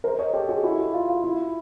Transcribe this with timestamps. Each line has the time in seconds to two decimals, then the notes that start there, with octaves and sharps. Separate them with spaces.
0.04 A#4 C5
0.19 C#5 D#5
0.33 G4 A4
0.49 F#4 G#4
0.64 E4 F#4
0.93 F4
1.09 F4
1.24 E4